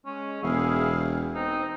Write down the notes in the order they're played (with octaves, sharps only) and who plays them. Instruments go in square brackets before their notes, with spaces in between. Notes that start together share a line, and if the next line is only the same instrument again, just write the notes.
[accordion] G#3 [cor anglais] C#4
[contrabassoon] E1 [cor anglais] E4 [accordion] G#4 F5
[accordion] C4 [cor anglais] D#4